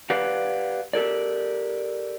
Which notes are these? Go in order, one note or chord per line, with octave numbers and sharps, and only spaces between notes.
G4 B4 D5 F5 F#5
G4 A4 A#4 D5